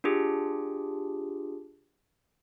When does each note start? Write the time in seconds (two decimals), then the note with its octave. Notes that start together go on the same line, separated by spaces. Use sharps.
0.04 D4 F4 G4 G#4